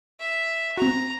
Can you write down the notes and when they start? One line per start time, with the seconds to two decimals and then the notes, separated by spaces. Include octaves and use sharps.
0.20 E5
0.77 C4 F#4 A#5